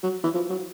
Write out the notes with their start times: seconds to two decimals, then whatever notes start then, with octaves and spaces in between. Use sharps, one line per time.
0.03 F#3
0.24 E3
0.34 F3
0.50 F#3